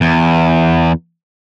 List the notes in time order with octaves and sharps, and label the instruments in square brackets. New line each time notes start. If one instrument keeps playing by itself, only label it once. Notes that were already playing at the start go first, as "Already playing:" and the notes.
[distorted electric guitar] E2